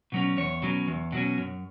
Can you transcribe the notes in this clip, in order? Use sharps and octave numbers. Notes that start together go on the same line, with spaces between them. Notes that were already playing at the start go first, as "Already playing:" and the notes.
B2 F#3 C#4
E2 C#5
B2 F#3 C#4
E2
B2 F#3 C#4
F#2